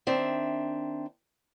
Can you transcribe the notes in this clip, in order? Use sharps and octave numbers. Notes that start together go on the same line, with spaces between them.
D#3 C4 D4 E5